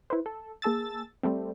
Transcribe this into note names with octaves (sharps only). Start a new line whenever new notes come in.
E4 B4 C5
A4
A#3 G#4 A5 E6 A6
G3 A3 C4